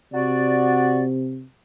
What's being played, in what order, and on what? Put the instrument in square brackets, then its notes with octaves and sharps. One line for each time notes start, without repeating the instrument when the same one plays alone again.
[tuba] C3 [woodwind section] F#4 D5